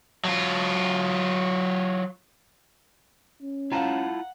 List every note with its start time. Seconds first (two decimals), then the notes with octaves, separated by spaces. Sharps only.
0.25 F#3 F4
3.42 C#4
3.72 E4 F4 F5 F#5 A5 A#5